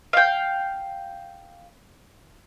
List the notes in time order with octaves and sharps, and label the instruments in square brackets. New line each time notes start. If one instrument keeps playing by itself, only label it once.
[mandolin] F5 G5